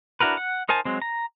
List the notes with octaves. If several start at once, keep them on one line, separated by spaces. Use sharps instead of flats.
D4 E4 F#4 A#4 B4
F#5
D#4 A#4 C5 G#5 A5
F#3 G#3 C4
A#5